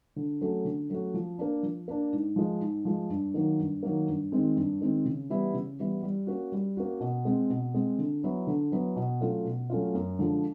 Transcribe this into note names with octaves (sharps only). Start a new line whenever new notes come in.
D3
F#3 A3 C#4 F#4
D3
F#3 A3 C#4 F#4
F3
A#3 D4
F3
A#3 D4
G#2
F3 G#3
G#2
F3 G#3
G2
D#3 F#3 A#3
G2
D#3 F#3 A#3
G2
D#3 G#3 C4
G2
D#3 G#3 C4
C#3
E3 G3 B3 E4
C#3
E3 G3 B3 E4
G3
A#3 C#4 F#4
G3
A#3 C#4 F#4
B2
G#3 C4
B2
G#3 C4
D3
F#3 B3 E4
D3
F#3 B3 E4
B2
F#3 A3 C#4 F4
B2
F#3 A3 C#4 F4
F#2
D3 F3 G#3